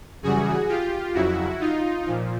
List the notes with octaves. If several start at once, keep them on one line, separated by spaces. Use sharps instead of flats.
F#2 C#3 E3 G3 F#4 G#4
F4 G4
F2 C#3 F#3 E4 F#4
D#4 F4
A#2 F3